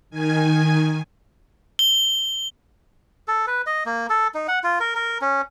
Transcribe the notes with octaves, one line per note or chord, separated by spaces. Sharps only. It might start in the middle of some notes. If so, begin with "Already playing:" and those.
D#3 G#5
G7
A4
B4
D#5
A#3
A4
D#4
F#5
F4
A#4
A#4
C#4